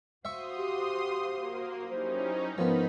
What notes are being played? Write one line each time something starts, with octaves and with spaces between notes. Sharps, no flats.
F#4 C5 E5 F5 C6 C#6 D#6
G4
A#3
F#3 C#4 D#4 E4 G4 C5
G#2 F3 B3 D#4 E4 A#4 B5